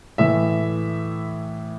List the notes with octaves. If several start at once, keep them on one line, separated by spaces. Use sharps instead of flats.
A2 E3 E5